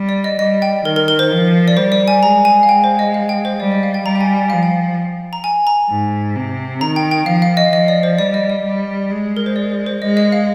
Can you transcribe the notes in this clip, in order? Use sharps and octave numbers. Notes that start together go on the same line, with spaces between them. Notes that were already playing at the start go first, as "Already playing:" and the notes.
Already playing: G3
D5
D#5
G3 D#5
G5
D#3 A#4
A#4
A#4
C5
F3
D5
G3 C5
D5
G#5
G#3 A#5
G#5
F5
G#3 G5
C5
D#5
F5
G5
C5
G3 D5
D#5
F5
G5
G3 A#5
G5
G#5
G5
F3 F5
G5
A#5
G#5
A#5
G#2
C3
D#3 A#5
G5
G5
F3 F5
F5
D#5
F3 D#5
D5
C5
G3 D5
D#5
D5
G3
G#3
A#4
C5
D5
C5
C5
G#3 D#5
D#5
F5